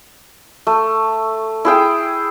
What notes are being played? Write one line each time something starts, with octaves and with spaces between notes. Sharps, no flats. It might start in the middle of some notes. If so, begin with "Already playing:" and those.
A3
E4 G#4 G5